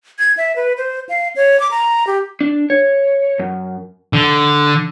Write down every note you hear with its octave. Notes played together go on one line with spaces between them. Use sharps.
G#6
E5
B4
C5
F5
C#5
D6
A#5
G4
D4
C#5
F#2
D3